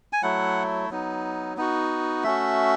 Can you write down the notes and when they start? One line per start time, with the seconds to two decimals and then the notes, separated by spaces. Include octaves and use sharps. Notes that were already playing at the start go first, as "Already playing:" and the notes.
0.13 G#5
0.23 F#3 A3 E4 F#5
0.90 F#3 B3 D#4
1.57 B3 D#4 F#4
2.24 A3 C#4 F#4 E5